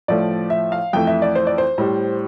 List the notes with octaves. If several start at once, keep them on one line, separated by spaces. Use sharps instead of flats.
A2 F3 A3 D5
E5
F5
F2 E3 A3 G5
E5
D5
C5
D5
C5
A2 G3